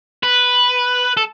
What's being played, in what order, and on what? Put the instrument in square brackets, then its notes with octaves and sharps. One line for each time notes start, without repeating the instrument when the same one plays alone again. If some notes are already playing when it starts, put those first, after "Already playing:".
[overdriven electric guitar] B4
A4